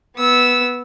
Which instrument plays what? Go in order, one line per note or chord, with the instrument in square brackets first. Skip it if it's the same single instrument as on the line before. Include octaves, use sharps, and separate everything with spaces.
[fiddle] B3 E6